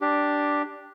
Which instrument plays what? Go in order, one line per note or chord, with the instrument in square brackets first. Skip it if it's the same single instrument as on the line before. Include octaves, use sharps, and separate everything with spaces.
[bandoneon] D4 G4